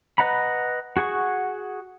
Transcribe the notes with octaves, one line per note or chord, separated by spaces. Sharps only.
B4 D#5 F#5 A#5 B5
F#4 G#4 F#5 C#6